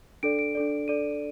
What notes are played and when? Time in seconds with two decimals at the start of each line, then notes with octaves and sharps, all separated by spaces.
0.23 D4 A4 D5 D7
0.39 D7
0.55 D4 A4 D5
0.88 D4 A4 D5 D#7